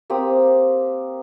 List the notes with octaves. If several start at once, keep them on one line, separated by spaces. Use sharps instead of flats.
A#3 C4 G4 D#6